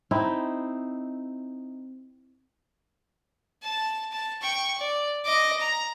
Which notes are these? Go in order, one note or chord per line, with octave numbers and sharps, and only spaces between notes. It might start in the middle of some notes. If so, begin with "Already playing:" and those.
C4 D#4 E4
A5
A5
G5 C#6
D5
D#5 D6
A#5